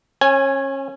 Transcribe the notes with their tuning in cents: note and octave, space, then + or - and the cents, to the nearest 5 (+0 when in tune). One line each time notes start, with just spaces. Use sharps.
C#4 -30 G#5 +0